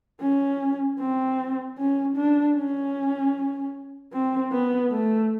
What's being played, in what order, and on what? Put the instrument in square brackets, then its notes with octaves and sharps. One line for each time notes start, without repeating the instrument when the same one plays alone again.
[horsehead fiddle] C#4
C4
C#4
D4
C#4
C4
B3
A3